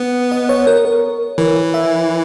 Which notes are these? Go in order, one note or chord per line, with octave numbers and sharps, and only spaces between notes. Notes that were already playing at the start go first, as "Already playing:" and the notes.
Already playing: B3
D#5
C#5
A#4
A#4
E3 A#4
E5